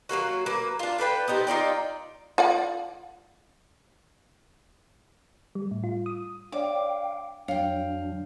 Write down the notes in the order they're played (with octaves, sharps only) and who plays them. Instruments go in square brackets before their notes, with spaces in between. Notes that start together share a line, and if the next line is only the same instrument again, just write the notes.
[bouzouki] F#3 G#3 A#3 F#4
A#3 B4
D4 F4
D4 A4 B4 G5
B3 C4 D#4 G4
D#4 F4 D5 G5
[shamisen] F4 D5 F#5
[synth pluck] G3
A2
F4
D#6
[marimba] D4 C#5 D5 [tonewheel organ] F5 G5 [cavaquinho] D6
[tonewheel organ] F2 F#3 D4 [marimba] C#5 [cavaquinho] F5 G5